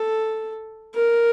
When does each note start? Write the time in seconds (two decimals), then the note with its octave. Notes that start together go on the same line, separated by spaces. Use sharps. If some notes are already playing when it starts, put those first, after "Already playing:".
Already playing: A4
0.95 A#4